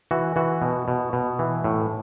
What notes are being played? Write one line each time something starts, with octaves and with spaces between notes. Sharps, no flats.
E3 F#4
E3 F#4
B2
B2
B2
E3
A2